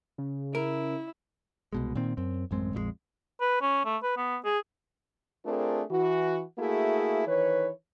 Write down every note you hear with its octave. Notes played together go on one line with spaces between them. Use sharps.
C#3
E4 A#4
C2 B2 G#3
A#2 D#3 C4
F#2 C4
A1 F#2 G#3 C4
A#1 F2 F3 G#3
B4
C#4
A3
B4
B3
G#4
A3 C4 D4 F4 G#4 A#4
E3 F#4
A3 A#3 E4 F#4 G#4
D#3 E3 B4 C#5